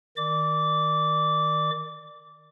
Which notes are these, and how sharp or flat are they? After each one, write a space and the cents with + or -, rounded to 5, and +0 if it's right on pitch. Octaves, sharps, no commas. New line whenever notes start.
D#3 +0 D5 +15 D6 -20